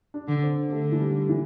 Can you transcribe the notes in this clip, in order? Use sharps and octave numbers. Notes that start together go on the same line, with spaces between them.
D4
D3
C4
D3 A3
E3
G3
E3